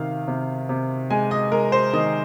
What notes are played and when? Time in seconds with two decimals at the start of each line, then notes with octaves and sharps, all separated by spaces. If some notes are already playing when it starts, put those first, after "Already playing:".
Already playing: C3 D#3 F5
0.28 C3
0.69 C3
1.10 G#3 G#5
1.31 D#5
1.52 G#3 A#4
1.72 C5
1.94 D#3 D#5